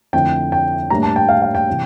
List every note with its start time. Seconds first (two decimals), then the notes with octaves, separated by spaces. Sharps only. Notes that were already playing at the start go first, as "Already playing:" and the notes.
0.13 F2 D3 A3 C4 E4 G5
0.52 G5
0.90 A2 G3 A#3 D4 A#5
1.03 A5
1.16 G5
1.29 F5
1.42 F5
1.55 G5
1.69 C3 E3